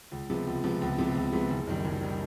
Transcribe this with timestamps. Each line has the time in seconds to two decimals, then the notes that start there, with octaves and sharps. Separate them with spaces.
0.12 C#2
0.30 C3 F3 G#3 B3
0.47 C#2
0.64 C3 F3 G#3 B3
0.82 C#2
0.98 C3 F3 G#3 B3
1.15 C#2
1.33 C3 F3 G#3 B3
1.50 F#1
1.67 F#2 D#3 G3
1.85 F#1
2.02 D#3 G3